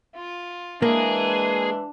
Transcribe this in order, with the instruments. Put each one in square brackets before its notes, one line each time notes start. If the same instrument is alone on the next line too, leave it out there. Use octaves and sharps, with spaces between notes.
[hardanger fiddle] F4
[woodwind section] E3 G#3 [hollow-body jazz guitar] A#3 [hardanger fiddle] D4 [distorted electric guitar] G#4